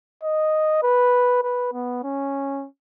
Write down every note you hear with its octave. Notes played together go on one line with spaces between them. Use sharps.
D#5
B4
B4
B3
C#4